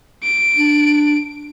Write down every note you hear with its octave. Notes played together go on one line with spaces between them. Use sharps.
D7
D4